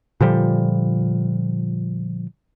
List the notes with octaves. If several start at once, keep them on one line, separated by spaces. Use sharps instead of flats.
A#2 D3 F3 G3